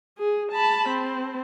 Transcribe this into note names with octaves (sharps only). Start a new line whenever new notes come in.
G#4
A5 B5
C4